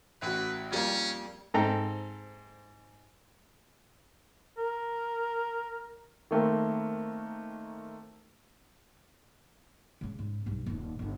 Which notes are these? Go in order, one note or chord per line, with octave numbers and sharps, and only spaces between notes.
A1 F#4 B4
F2 G3 A#3 C#4
G#2 C4 A4 G5 A#5
A#4
D#3 A3 A#3 C4
C#3 G#3
G#2 C#3
B1 G2
D#1 B1
G1 E4